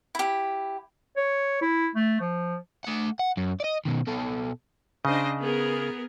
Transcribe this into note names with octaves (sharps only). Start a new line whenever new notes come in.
E4 G4
C#5
E4
A3
F3
A3 F#5
F#5
F#2
D5 D#5
B2 D#3
B2 A4
C#3 D4 C5 D#5
B3 G#4 A#4